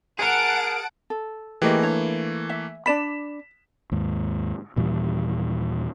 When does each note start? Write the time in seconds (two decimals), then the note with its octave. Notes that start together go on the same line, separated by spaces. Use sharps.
0.19 G#4 A#4 F#5 A5 D7
1.10 A4
1.62 E3 A3 A#3 G4 G#4 D#5
1.83 D4 C#5
2.49 E5
2.86 D4 D5 B5 B6 E7
3.92 D#2 G#2
4.76 D#2 A#2 E3 G3